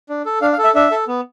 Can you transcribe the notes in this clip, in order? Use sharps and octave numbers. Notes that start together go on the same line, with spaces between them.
D4
A4
D4 F5
F5
A4
E5
D4 E5
A4
B3